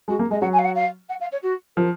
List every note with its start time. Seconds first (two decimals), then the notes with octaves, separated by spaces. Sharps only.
0.08 G#3 F#4
0.19 A#3
0.31 G#3 D#5
0.41 F#3 F#5
0.52 G#5
0.58 F5
0.64 F#5
0.75 F5
1.09 F#5
1.20 F5
1.31 C#5
1.42 F#4
1.76 F3 A#4